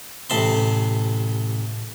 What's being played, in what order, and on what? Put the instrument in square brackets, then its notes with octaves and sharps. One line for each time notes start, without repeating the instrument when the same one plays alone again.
[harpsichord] A1 C3 A5 B5 C6